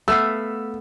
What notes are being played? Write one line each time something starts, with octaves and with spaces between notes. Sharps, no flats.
A3 B3 F5 E6